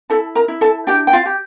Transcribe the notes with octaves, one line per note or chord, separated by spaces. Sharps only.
E4 A4 A5
A#4 A#5
E4
A4 A5
D4 G4 G5
G5
F4 F5
G4